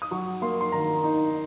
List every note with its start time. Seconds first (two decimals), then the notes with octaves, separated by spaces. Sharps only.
0.02 D#6
0.11 F#3 C#6
0.42 A#3 C6
0.61 C6
0.72 D#3 A#5
1.03 D#4